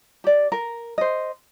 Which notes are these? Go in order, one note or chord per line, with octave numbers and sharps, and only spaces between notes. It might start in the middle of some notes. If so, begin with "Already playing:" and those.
G4 D5
A#4
C5 D#5